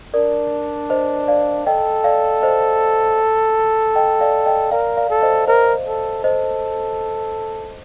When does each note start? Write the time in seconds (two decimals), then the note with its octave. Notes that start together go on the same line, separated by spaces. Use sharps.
0.14 D4 A#4 D5
0.90 C5 D#5
1.28 D5 F5
1.66 A4 D#5 G5
2.04 D5 F5
2.42 C5 D#5
3.96 D#5 G5
4.21 D5 F5
4.46 D#5 G5
4.72 A#4 D5 F5
4.97 D5 F5
5.10 A4
5.22 C5 D#5
5.47 A#4 C5 D#5
5.86 A4
6.24 A4 C5 D#5